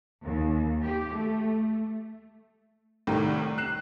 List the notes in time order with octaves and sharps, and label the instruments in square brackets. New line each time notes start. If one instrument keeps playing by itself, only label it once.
[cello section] D#2
G4
A3
[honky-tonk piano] C2 A2 C3 D#3
F#6 C7 E7